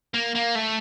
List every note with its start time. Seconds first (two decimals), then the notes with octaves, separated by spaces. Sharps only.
0.14 A#3
0.35 A#3
0.55 A3